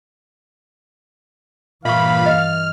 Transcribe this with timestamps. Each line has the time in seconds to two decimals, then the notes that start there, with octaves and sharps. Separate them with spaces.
1.85 G2 A#2 E3 E5 F5 B5 C#6
2.26 D#5 F6